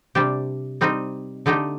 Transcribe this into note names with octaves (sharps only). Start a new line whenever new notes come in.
C3 G3 D4 G4
G3 C4 D#4
D3 A3 D#4 G4